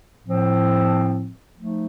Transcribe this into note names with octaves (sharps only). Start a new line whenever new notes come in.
A2 F3 C4
F3 A3 D#4